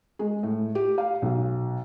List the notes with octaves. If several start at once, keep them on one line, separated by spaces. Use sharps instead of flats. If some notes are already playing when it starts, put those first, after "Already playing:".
G#3
A2
G4
F5
B1